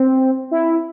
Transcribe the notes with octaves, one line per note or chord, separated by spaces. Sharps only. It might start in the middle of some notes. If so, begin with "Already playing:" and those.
Already playing: C4
E4